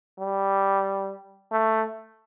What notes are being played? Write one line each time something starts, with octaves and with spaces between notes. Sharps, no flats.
G3
A3